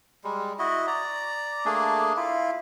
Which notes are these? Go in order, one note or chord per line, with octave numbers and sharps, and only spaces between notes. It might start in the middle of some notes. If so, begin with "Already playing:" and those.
G3 G#3
E4 F#4 D#5
D5 A#5
A3 A#3 D4 G#4
E4 F4